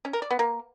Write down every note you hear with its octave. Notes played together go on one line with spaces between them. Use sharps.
C#4
A#4
D5
B3
A#3